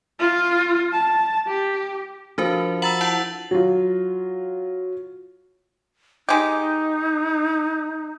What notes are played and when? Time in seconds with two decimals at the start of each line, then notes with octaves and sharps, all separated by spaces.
0.19 F4
0.93 A5
1.47 G4
2.38 F3 D4 F#4 A4 A#4
2.82 F#5 A#5 B5 E6 A6 F#7
3.01 E4 F#5 A5 F#7
3.51 F#3 F4
6.29 G#3 D#4 G4